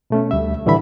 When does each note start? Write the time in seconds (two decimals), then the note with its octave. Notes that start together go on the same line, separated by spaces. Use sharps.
0.10 B2 A3 C#4
0.31 D2 G3 E5
0.66 A2 D3 E3 G3 E5 B5